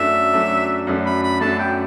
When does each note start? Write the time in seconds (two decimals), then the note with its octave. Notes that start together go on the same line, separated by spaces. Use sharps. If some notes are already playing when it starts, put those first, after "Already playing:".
Already playing: F#2 F#3 A3 D4 E5
0.33 F#2 F#3 A3 D4
0.87 F#2 F#3 A3 D4
1.06 B5
1.23 B5
1.41 F#2 F#3 A3 D4 A5
1.59 G5